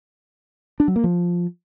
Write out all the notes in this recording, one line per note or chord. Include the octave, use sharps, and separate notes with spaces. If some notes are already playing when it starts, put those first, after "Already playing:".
D4
F#3
A#3
F3